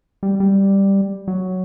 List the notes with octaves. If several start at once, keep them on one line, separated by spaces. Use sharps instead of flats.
G3
G3
F#3